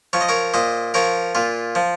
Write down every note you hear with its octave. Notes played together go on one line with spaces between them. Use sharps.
F3 C#5
D#5
A#4 C#5
A#2 C5 D#5
F3 A#4 C#5
A#2 F4
F3